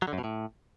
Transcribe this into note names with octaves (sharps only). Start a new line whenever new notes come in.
F#3
D3
F#2
B2
A2